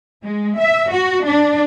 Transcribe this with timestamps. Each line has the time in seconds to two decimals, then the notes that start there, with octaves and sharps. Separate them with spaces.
0.23 G#3
0.60 E5
0.91 F#4
1.25 D4